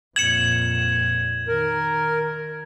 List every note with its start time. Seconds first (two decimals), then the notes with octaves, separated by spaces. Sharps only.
0.16 F2 A#2 G#6 C#7 E7 F#7
1.48 D#3 A#4